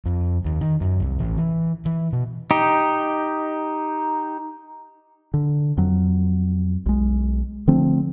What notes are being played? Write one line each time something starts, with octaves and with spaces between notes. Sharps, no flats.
F2
D#2
D#3
F#2
C2
A1
E3
E3
B2
D#4 G4
D3
F2 F#3
B1 G#3
D3 F3 A3 C4